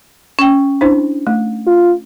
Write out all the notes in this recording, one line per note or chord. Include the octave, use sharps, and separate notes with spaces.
C#4 G5
D4 E4 C5
A3
F4